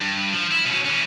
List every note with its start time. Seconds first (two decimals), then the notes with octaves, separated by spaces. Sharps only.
0.01 G2
0.33 F3
0.51 E4
0.65 B2 C#4
0.85 E3 C#4